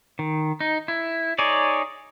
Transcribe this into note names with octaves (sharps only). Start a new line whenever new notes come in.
D#3
D#4
E4
D#4 G#4 C#5 D5